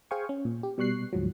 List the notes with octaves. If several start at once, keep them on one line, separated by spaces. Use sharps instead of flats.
G#4 C5 F5 G5 G#5 C#6
C#4
A#2
G4
B2 G3 C#6 F#6 C7
D2 G#2 F3 F#3